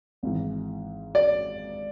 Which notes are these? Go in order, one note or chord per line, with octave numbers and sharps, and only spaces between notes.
G#1 G#2 E3
D5